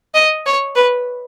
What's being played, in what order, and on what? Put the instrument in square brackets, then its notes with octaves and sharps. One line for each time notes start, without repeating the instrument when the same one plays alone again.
[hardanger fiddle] D#5
C#5
B4